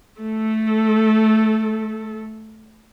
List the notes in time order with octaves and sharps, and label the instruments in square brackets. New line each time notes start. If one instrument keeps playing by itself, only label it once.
[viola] A3 A4